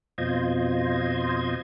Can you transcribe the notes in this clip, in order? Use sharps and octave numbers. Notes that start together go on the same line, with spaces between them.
F2 B2 F4 C5 D#5 G#6